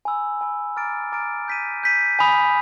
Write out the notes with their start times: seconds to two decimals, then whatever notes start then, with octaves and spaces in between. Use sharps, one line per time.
0.05 G#5 B5 E6
0.41 G#5 B5 E6
0.77 A#5 D6 F6 A6 D7
1.12 A#5 D6 F6 A6 D7
1.48 G6 B6 D#7
1.83 G6 B6 D#7
2.19 G#5 B5 D#6